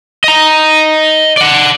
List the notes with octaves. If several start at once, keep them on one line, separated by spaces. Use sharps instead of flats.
D#5 A#5
D5 F#5